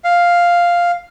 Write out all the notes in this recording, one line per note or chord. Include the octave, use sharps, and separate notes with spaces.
F5